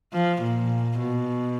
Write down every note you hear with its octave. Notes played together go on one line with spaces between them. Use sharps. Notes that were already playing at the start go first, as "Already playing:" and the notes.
F3
A#2
B2